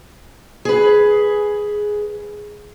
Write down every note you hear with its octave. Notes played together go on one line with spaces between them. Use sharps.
G#4 B4